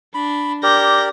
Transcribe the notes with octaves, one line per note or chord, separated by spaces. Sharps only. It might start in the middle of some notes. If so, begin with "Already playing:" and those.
D4 B5
G4 A#4 D5 G6 A#6